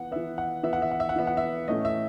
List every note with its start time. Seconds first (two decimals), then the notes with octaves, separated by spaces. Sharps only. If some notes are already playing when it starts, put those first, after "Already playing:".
Already playing: E3 B3 F#5
0.11 E3 B3 E5
0.38 F#5
0.63 E3 B3 E5
0.73 F#5
0.82 E5
0.91 F#5
1.00 E5
1.09 F#5
1.16 E3 B3 E5
1.27 F#5
1.37 E5
1.68 A2 E3 A3 C#4 D#5
1.85 E5